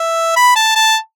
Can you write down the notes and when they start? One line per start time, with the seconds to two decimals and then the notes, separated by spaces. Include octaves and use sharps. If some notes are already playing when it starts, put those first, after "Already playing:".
Already playing: E5
0.36 B5
0.56 A5
0.75 A5